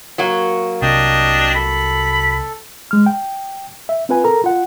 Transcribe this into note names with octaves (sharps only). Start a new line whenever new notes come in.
F#3 A#3 F#4
C2 C3 D4 D#5 G5 D#6
A4 B5
G#3 F6
G5
E5
C4 F4 B4 G#5
A4 A#4 A#5
F4 F#5